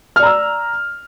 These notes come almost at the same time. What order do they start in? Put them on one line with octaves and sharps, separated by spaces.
F6 D5 A#5 E6